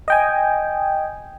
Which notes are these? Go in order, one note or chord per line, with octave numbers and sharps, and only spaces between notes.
D#5 G5 G#5